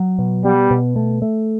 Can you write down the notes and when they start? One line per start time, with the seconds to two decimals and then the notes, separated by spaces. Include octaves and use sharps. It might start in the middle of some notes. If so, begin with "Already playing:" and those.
Already playing: F#3
0.19 B2
0.44 G3 B3
0.71 B2
0.96 A3
1.22 A3